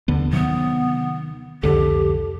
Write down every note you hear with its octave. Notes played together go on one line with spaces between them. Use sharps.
D#2 D3 B3
C3 D#3 F#3 B3
C2 F2 D3 G4 A4